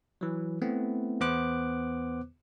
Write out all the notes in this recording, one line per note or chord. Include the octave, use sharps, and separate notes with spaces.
E3 F#3
A3 B3 C4 E4
E2 B3 B4 C5 D6 F#6